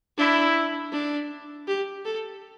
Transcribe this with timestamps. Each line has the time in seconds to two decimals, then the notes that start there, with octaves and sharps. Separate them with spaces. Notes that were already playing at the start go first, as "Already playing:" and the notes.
0.18 D4 E4
0.93 D4
1.68 G4
2.05 A4